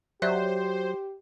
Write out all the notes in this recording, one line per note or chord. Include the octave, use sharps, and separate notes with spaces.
F#3 G4 C5 D5 E5 F#6